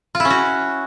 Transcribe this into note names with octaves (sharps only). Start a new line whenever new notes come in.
F4
E4
C#4
F#4